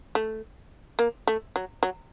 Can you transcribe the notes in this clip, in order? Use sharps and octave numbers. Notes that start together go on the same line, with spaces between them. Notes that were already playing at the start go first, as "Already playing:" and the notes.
A3
A#3
A3
F#3
F#3